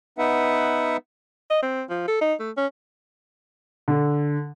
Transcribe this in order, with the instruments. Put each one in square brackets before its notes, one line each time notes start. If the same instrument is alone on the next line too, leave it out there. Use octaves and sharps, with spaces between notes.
[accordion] B3 D#4 B4 E5 F#5
[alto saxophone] D#5
C4
F3
A4
D#4
A3
C#4
[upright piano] D3